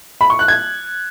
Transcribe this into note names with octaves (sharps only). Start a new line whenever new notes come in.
B5
C#6
F#6
G#6